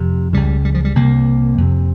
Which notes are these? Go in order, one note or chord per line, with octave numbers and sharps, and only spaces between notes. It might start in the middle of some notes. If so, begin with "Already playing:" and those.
Already playing: F2 C3
C#2 C#3 G3
G3
F3
G3
C2 C3 A#3
F2 C3